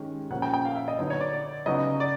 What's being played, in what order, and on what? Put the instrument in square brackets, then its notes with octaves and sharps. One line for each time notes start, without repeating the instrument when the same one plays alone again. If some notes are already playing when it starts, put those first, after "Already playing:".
Already playing: [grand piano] D#3 G#3 C#4 G4
[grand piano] A#2 F3 A#3 C#4 [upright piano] F#5
[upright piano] G5
G5
F5
E5
D#5
[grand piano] D3 F#3 B3 D#4 [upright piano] C#5
[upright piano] C#5
D5
D5
[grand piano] C#3 F#3 B3 D#4 F#4 [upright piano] D#5
[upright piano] D5